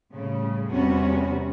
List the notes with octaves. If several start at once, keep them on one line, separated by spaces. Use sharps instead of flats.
A2 C#3 G3
E2 C3 G3 B3 C#4 F#4